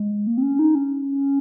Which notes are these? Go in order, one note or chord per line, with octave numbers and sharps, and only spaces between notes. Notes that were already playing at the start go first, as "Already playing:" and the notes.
Already playing: G#3
A#3
C4
C#4
D#4
C#4